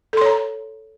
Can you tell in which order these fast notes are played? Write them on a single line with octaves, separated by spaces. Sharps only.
A4 C6 C#5 A#5